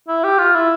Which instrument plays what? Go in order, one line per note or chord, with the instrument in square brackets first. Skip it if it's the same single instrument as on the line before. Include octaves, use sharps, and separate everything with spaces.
[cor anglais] E4
G4
F4
E4